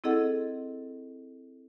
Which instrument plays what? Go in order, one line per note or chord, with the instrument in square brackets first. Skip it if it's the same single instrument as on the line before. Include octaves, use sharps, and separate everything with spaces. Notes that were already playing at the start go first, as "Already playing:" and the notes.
[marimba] C4 E4 G#4 A4 D#5 F#5